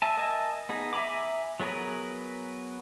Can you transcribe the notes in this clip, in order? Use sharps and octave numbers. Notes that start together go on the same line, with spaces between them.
E5 G#5 A5
A#4 D#5 E5 G#5 A5
B3 D#4 G#4
E5 G#5 A#5 B5 D6
F#3 B3 G#4 A#4 B4